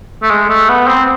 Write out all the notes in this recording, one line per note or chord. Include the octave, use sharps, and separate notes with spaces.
A3
G#3
A3
B3
C4